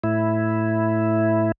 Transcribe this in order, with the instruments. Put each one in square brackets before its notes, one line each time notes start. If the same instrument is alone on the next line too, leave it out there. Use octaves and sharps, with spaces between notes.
[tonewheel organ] A2 E4